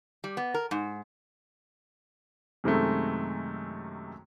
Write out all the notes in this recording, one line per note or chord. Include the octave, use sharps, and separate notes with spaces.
G3
B3
A#4
G#2
F#2 C3 D#3 G#3 A3